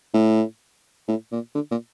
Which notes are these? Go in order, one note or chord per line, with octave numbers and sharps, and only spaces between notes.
A2
A2
A#2
D3
A#2